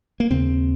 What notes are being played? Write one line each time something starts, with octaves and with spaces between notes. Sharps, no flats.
A#3
D#2 C#3 C4